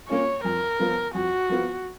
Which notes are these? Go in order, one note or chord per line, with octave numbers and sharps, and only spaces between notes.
A#3 C#4 F4 C#5
F2 A#4
F3 B3 F4
F2 F#4
F3 B3 F4